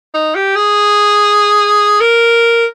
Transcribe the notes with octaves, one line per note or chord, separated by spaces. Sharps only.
D#4
G4
G#4
A#4